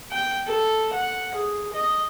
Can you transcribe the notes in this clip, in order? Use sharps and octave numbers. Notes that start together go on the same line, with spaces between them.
G5
A4
F#5
G#4
D#5